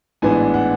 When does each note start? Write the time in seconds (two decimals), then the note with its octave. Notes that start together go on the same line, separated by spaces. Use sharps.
0.22 A1 G#2 E3 B3 D4 G#5
0.54 F#5